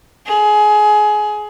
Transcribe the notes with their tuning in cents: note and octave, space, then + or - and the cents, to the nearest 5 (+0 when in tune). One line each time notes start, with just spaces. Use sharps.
G#4 +20